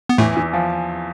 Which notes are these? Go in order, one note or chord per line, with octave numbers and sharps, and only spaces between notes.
B3
E2 A2 E3 A3
E2 E3
F3